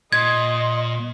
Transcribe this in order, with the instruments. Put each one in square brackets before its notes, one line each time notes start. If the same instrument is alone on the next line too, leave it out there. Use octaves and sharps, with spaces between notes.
[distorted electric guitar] A#2 [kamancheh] D#5 [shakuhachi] C6 [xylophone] G#6